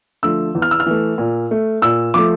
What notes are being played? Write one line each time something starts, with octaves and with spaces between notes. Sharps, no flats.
D3 F3 A3 E6
E2
F6
E6
F6
E3 A3
A#2
A3
A#2 E6
F3 A3 D6